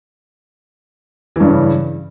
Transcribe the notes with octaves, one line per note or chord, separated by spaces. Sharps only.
G2 C#3 E3